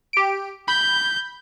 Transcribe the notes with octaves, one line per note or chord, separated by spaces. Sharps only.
G4 D7
B5 G6